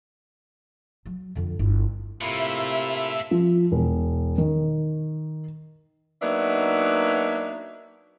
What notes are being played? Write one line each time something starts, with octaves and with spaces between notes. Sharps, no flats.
F#3
F2 D3
G1 E4
A2 C3 A#3 E4 F4 E5
F3
E1
D#3
F#3 A#3 B3 D4 D#4 E5